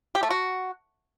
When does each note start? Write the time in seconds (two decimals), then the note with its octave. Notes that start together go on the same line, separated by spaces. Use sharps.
0.15 G4
0.23 A3
0.30 F#4